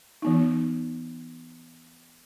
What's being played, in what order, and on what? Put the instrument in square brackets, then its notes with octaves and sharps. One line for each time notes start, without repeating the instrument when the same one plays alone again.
[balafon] E3 B3 D#4